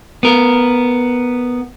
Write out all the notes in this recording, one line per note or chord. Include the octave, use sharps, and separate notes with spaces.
B3 A#4